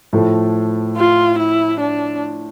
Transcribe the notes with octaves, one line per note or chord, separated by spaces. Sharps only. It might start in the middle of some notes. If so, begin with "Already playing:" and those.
A2 F3 A3
F4
E4
D4